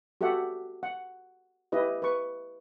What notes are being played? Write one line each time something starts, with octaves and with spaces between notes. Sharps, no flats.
F#4 G4 A4 E5 F#5
F#5
E4 G4 B4 D#5
B4 C#6